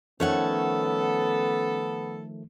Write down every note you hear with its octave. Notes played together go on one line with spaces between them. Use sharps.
D#3 F3 A3 B3 C#4 A4 C#5 F#5